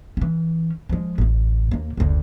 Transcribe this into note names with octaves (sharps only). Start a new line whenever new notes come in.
E3 C#4
F3 G#3
D1 A1
D#2 A#3
F#1 D2